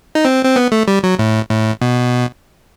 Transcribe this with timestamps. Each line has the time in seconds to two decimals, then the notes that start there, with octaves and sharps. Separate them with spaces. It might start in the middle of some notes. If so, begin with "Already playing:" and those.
0.15 D#4
0.25 C4
0.45 C4
0.56 B3
0.72 A3
0.88 G3
1.03 F#3
1.19 A2
1.50 A2
1.81 B2